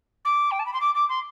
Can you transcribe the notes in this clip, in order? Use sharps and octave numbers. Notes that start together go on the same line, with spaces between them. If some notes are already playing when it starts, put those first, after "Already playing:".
D6
G5
A5
B5
C6
D6
D6
C6